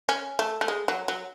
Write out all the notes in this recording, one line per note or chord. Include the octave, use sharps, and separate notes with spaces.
C#4
A3
A3
G#3
F#3
F#3